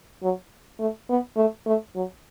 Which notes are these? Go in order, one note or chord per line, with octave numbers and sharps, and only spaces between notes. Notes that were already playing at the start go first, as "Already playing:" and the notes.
F#3
A3
B3
A3
A3
F#3